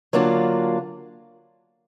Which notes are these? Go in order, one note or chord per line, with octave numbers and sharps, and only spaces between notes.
D3 F#3 A#3 D4 F4